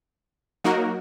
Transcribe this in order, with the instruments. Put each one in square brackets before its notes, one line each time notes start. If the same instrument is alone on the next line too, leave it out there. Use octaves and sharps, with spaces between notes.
[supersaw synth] F#3 A#3 D#4 F#4 A#4